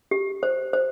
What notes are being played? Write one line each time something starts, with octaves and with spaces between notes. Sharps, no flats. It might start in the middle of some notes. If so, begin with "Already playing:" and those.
G4
C5
C5